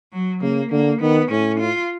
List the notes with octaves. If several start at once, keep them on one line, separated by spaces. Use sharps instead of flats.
F#3
C#3 A#3
D3 A#3
D#3 B3
A2 C#4
F4